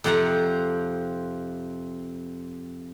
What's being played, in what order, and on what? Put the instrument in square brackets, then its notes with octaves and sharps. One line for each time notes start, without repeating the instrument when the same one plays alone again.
[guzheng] F2 C3 F3 F#5 A#5